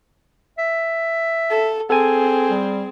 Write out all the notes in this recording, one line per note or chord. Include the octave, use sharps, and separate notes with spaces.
E5
A4
C4 G#4 A4 G#5
G3